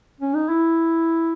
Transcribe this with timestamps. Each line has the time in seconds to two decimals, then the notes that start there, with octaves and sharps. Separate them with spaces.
0.21 C#4
0.34 D#4
0.49 E4